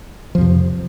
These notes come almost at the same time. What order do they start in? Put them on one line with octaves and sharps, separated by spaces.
F3 F2 C3